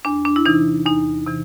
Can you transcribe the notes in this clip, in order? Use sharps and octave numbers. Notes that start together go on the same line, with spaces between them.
E2 D4
D4
E4
C3 E3 D#4
E2 D#4
C3 E3